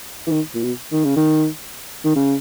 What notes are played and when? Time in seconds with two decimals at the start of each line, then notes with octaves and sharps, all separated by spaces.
0.27 E3
0.31 D#3
0.55 A#2
0.63 B2
0.92 D#3
1.05 C#3
1.16 D#3
2.05 D#3
2.16 C#3